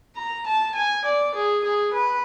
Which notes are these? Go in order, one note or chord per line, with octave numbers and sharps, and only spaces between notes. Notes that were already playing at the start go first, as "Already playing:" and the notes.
A#5
A5
G#5
D5
G#4
G#4
B4